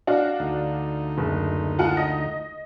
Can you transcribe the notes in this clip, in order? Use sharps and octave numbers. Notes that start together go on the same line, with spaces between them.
D4 F#4 F5
D2 D#4
F#1
F4 F#5 A5
D#5